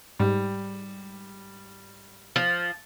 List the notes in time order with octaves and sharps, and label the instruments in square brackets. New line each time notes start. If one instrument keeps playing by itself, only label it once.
[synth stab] G#2 [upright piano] G3
[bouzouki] F3